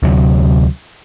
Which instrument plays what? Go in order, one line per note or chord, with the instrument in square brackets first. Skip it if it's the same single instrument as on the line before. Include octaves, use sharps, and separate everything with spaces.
[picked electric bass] D2 C3 F#3